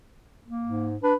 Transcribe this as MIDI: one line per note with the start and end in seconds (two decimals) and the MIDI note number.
0.46 0.90 58
0.65 0.97 44
1.03 1.14 62
1.03 1.15 71